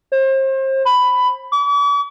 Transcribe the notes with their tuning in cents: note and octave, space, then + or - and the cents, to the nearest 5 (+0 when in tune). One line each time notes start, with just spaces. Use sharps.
C5 +35
B5 +10
D6 -45